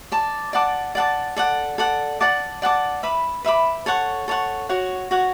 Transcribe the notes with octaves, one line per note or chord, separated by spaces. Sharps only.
D5 A5 D6
D5 F#5 A5 D6
D5 F#5 A5 D6
A4 D5 F#5
A4 D5 F#5
D5 F#5 A5 D6
D5 F#5 A5 D6
B4 E5 B5 D6
B4 E5 B5 D6
A4 C#5 F#5 C#6
A4 C#5 F#5 C#6
F#4 C#5 F#5
F#4 C#5 F#5